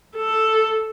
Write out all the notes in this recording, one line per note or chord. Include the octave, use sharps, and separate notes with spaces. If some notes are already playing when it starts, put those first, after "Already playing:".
A4